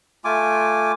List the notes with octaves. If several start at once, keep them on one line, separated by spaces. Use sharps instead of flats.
A3 F4 G#5 D6